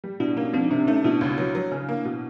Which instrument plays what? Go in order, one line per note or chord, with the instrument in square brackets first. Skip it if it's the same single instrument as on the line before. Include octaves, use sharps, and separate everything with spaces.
[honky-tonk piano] G3
[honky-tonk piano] B2 [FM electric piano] D4 E4
[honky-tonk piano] A#3 [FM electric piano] C#4 D#4
[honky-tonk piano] F3 [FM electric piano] C4 D4
[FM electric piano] D#4
[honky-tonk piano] C3 [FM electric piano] C4 D4
[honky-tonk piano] A3 [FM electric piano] C#4 D#4
[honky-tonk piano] B2 [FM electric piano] D4 E4
[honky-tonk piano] C#2
F#3
F#3
C#3
A#3
B2